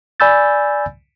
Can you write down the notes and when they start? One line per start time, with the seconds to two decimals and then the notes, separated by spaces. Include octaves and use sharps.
0.20 D5 G#5 B5 E6 G6 A6